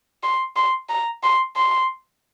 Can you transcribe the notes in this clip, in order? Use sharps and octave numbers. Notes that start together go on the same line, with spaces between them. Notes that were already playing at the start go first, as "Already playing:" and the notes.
C6
C6
A#5
C6
C6